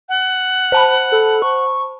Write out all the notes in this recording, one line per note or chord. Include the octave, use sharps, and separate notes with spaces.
F#5
C5 A5 B5
A4
C#6